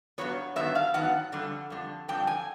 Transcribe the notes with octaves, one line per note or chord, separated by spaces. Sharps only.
G2 D#3 F#3 B3 C#5
G2 D#3 F#3 B3 E5
F5
G2 D#3 F#3 B3 F#5
F2 D3 G3
F2 D3 G3
F2 D3 G3 G5
G#5